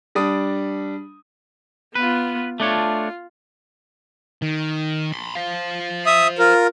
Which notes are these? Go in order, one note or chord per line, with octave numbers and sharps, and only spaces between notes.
G3 D4 D#6
B3 F4 B4
A3 D4 F4 C#5
D#3
B5 C6
C5 F5
E5 D#6
F4 A#4